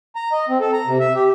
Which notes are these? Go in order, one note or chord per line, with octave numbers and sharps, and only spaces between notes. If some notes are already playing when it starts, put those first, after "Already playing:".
A#5
D#5
C4
A4
A#5
C3
E5
G4